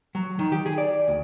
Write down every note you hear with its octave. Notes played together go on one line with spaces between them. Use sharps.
F#3
D#3
G4
G#4
D5
D2